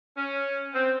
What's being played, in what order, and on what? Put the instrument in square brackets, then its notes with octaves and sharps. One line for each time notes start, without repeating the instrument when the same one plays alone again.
[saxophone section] C#4
C4